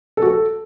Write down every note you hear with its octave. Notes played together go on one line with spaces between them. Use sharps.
A4
F#4
A4